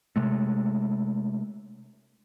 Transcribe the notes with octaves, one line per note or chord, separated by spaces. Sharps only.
C3 G#3 A3